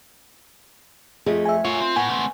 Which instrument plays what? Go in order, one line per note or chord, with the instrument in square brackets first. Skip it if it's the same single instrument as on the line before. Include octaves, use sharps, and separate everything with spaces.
[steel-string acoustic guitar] F2 F3 A3 [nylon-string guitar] G#4 D#5
[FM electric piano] E5 G#5
[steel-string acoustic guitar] F4 [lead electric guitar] A#4 C#5 [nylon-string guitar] F#5
[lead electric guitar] C4
[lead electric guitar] A2 [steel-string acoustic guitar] B3 [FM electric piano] G#5
[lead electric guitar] A3 C4